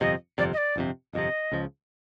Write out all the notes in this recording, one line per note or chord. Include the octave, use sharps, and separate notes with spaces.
G1 F2 C3 D#5
G1 F2 C3 D5
D#5
D5
G1 F2 C3
G1 F2 C3 D#5
C#2 C#3 F3